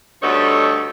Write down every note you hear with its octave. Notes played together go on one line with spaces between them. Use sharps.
D2 G2 B3 D#4 A4 C#5